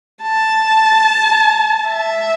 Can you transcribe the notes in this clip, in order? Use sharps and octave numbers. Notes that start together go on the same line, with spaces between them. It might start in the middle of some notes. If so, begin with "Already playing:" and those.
A5
E5